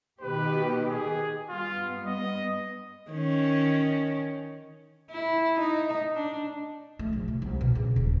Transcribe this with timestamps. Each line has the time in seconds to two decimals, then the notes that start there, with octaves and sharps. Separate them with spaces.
0.21 B2 D#3 G4 B4
0.90 G#4
1.50 G2 B3 F4
2.06 D#5
3.10 D#3 C#4
5.10 E4
5.60 D#4
6.15 D4
6.99 A3
7.13 A#1
7.28 C3
7.42 C2
7.61 B2
7.75 C#3
7.96 D#1